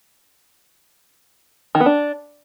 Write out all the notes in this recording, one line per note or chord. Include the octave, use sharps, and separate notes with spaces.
D#3
B3
D4